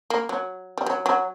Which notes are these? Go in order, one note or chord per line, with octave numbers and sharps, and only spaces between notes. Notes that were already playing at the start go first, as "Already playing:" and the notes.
A#3
F#3
G3
F#3
F#3